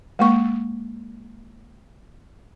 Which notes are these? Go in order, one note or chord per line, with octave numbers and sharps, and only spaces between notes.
G#3 A#3 C#6